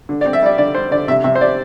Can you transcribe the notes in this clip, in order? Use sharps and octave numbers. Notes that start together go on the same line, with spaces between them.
D3
D5
C4
E5
G3 D5
D3 D5
G3 C5
D3 D5
C3 E5
C3 E5
C5
D5